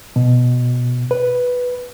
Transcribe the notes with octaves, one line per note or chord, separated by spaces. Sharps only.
B2
B4